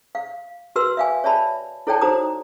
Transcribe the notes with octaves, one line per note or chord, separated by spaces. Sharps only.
F5
F#4 A#4 B4 C6 E6
E5 F5 G#5
C#5 D5 E5 A5 B5
E4 A4 C#5 D5 G5 A5
D#4 F#4 C5 A#5 D#6